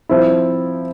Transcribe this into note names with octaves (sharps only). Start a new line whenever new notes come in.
F3 C4 E4